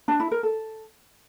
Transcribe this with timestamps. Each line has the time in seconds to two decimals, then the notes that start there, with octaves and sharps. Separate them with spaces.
0.08 D4
0.20 E4
0.31 A#4
0.43 A4